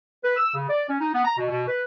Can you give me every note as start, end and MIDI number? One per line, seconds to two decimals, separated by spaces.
0.23 0.34 71
0.37 0.54 88
0.55 0.65 49
0.68 0.84 74
0.89 0.96 61
1.00 1.09 63
1.13 1.22 59
1.25 1.37 82
1.37 1.48 47
1.49 1.62 47
1.67 1.81 71